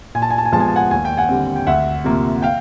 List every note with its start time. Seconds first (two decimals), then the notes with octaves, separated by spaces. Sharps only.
0.15 A#2 G#5
0.22 A5
0.30 G#5
0.38 A5
0.45 G#5
0.53 F3 G#3 B3 A5
0.60 G#5
0.68 A5
0.76 F#5 G#5
0.91 D#2 G#5
1.05 G5
1.17 F#5 G#5
1.28 D3 G3 C4
1.56 G5
1.67 D2 E5 F#5
2.04 C3 F3 A#3
2.42 F5 G5